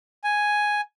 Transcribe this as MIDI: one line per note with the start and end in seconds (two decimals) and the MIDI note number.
0.24 0.81 80